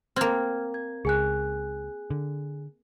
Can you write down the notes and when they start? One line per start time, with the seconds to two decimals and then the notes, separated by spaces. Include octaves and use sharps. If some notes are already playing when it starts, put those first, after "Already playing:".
0.16 A#3 C4 F6 G#6
0.74 G#6
1.05 C#2 G#4 G#5 F#6
2.10 D3